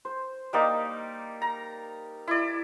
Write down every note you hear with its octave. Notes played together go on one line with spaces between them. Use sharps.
C5
G3 A#3 D#4 D5
A#5
E4 D5